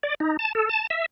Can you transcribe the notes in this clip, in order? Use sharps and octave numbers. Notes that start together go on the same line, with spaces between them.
D5
D#4
A5
A4
A5
E5